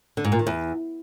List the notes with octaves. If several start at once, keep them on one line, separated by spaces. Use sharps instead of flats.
D3
G#2
A#2
D#3
E2